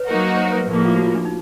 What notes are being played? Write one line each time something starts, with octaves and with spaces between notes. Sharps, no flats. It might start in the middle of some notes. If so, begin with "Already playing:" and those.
Already playing: B4 C#5
F#3 A#3 D#4 F#4 A#4
C5
B4
A2 F3 A#3 A#4
G#4
F4
F#4
F4
D4
D#4